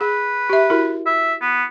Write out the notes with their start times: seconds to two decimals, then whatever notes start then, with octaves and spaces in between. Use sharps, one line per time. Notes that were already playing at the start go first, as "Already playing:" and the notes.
0.01 G#4 B4
0.50 G4 E5
0.70 E4 F#4 A#4
1.06 E5
1.41 B3